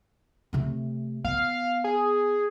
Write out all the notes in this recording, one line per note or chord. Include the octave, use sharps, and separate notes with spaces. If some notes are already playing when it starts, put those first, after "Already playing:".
C3 A3
B3 F5
G#4